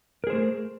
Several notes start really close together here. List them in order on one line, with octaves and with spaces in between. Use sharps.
A#4 G#4 C5 A3